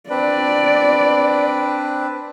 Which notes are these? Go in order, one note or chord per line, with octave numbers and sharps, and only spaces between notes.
C4 D4 B4 D5